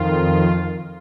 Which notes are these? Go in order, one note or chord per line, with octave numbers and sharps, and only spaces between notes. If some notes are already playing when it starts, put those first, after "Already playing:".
Already playing: F2 D#3 F4